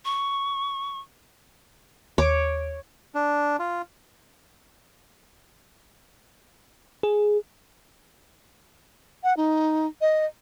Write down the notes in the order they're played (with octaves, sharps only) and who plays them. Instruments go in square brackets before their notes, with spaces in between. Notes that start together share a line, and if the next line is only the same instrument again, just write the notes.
[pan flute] C#6
[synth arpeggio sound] D#2 D7 [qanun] C#5 D6
[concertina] D4
F4
[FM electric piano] G#4
[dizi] F#5
D#4
D#5